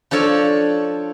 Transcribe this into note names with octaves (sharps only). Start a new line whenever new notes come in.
F3 D4 A4 C#5